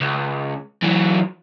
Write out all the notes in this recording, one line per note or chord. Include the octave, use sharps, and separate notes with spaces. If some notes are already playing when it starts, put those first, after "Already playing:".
C#2
E3 F#3